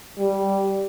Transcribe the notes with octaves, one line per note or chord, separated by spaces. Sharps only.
G3